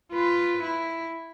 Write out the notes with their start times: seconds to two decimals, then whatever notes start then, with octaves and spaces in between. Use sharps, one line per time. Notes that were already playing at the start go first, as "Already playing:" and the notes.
0.13 F4 B4
0.63 E4